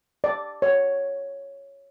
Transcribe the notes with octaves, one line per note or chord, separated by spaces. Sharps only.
D5
C#5